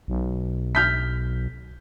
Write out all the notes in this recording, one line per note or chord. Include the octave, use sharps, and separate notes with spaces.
B1
F6 G6 B6